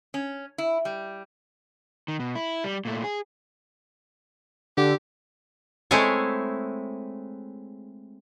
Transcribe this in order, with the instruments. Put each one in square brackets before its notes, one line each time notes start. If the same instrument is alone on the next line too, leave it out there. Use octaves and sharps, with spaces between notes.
[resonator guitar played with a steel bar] C#4
E4
G3
[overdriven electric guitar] D#3
B2
E4
G3
A#2 A3
G#4
[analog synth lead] D3 [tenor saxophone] G4
[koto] G#3 A3 C4 E4 G#4 C#5